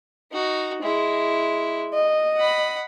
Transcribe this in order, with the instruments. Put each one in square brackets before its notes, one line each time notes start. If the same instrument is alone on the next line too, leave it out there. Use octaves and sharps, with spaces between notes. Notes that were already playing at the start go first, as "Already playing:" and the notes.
[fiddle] D#4 F#4
G#3 E4
[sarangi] D#5
[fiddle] F#5 B5